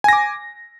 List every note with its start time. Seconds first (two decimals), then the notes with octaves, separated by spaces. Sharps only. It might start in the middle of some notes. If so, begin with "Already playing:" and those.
0.04 G#5
0.08 A#6
0.13 D6